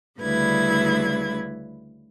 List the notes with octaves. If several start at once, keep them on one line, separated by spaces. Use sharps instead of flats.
D2 C#3 G3 E4 B4 G#6